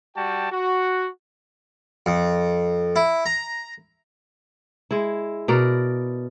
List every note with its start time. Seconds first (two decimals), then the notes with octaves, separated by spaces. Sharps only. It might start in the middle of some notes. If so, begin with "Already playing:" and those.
0.17 G3 F#4 G5 A5
0.52 F#4
2.06 F2
2.96 E4
3.26 A#5
4.91 G#3 E4
5.48 B2 A#4 D5